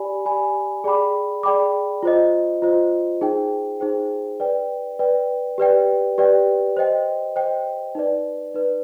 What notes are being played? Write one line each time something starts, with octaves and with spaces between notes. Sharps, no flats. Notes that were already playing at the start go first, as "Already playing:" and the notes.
Already playing: G4 D5 G#5 B5
G4 D5 G#5 B5
G#4 D5 G5 B5 D6
G#4 D5 G5 B5 D6
F4 C5 D#5
F4 C5 D#5
D#4 G#4 C5 G5
D#4 G#4 C5 G5
B4 D5 G5
B4 D5 G5
G4 B4 D5 G5
G4 B4 D5 G5
C5 D#5 G5
C5 D#5 G5
D#4 B4 D5
D#4 B4 D5